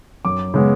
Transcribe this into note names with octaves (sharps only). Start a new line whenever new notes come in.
F#2 D6
C#3 G#3 B3